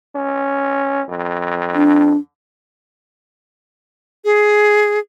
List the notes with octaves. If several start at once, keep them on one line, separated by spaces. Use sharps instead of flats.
C#4
F2
D4
G#4